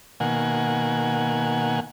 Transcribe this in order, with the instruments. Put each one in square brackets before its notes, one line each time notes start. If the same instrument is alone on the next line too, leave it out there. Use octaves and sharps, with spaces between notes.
[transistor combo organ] B2 D#3 A#3 F#5 G#5